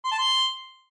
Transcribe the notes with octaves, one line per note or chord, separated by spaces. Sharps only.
C6
A5
C6